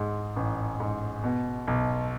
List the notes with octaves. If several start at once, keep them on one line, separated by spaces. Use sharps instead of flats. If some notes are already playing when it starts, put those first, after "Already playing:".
Already playing: G#2 G#3
A1
G#2
B2
B1